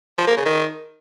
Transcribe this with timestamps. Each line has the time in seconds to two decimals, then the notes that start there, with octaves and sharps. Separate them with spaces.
0.18 F3
0.27 A#3
0.36 C#3
0.45 D#3